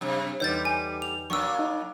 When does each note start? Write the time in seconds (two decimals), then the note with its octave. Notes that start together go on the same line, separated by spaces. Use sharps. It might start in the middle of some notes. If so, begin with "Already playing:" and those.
0.01 F#2 C3
0.40 E2 D3 G3 D#4 B4 C#5 G6 A6
0.65 G#5
1.02 F7
1.30 F#3 A#3 D4 C#6 E6
1.59 D#4